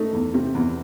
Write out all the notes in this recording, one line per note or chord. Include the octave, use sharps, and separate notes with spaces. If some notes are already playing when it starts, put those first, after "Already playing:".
Already playing: A3 D#4
E2
C3
E2